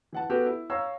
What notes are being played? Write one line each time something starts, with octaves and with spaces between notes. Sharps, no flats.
E3 F#5 A5
B3 F#4 G4 A4
E4
C#5 F5 A#5 E6